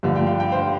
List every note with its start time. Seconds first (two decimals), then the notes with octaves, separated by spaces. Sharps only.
0.03 G2 D3 F3 A3 F5
0.16 G5
0.27 F5
0.40 G5
0.52 C5 F5